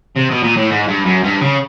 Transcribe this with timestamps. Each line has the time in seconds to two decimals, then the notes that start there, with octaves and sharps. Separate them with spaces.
0.16 C3
0.30 B2
0.43 A#2
0.57 A2
0.70 G#2
0.88 G2
1.05 F#2
1.23 G2
1.41 C#3